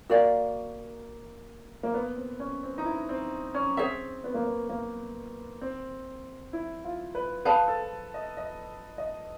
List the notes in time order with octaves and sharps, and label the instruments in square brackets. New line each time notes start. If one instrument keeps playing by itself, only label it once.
[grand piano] A#3 [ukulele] F#4 A#4 D5 F5
[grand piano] A#3
B3
C4
C#4
C4
D#4
E4
C4
C#4
[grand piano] C4 [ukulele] G#4 C#5 E5
[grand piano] B3
A#3
B3
A#3
C4
E4
F4
B4
[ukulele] G#4 C5 F5 A5 [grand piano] B4
[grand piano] A4
D#5
D#5
D#5